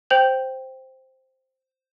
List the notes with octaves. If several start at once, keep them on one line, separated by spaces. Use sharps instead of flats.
C5 G5 G6 F7 F#7